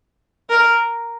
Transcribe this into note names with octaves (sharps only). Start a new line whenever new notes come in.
A#4